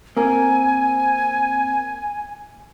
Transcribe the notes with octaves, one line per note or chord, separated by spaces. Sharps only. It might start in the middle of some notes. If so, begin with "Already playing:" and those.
A#3 C4 A#4 G#5